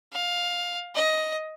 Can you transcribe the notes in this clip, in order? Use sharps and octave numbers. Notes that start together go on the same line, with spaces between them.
F5
D#5